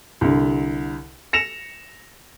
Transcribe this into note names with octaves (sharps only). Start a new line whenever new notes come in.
C2 D3
A#6 C#7 E7 F7